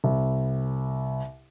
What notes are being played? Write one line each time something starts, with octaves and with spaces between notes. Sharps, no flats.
C2